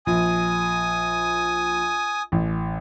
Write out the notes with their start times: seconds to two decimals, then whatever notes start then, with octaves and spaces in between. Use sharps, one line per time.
0.06 A#1 G#5 D#6
2.32 A1